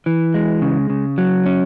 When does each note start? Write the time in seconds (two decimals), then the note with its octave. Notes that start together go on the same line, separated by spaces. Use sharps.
0.06 E3
0.34 G#3
0.62 C#3
0.90 C#3
1.18 F#3
1.46 C#4